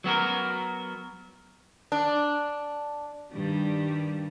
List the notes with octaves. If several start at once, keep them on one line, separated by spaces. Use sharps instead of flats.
F#3 B3 F#4 A#4
D4
G2 D#3 G3